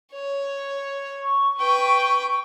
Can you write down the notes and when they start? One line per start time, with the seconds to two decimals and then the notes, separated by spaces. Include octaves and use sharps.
0.13 C#5
1.23 C#6
1.59 B4 G5